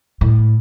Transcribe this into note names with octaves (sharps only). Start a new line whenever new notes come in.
A2